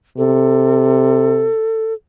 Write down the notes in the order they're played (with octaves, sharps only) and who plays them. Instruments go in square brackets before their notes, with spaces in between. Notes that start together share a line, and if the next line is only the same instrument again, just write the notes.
[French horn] C3 [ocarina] A4